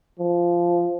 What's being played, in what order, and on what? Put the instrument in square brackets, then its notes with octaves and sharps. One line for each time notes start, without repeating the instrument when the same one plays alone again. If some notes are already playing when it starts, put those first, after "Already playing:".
[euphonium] F3